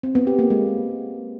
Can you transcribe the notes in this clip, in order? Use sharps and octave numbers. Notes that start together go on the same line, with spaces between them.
C4
B3
G4
A#3
G#3